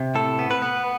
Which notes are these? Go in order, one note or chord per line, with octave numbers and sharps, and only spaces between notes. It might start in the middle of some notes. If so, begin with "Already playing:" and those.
Already playing: C3
A2 A4
B3
B4
B3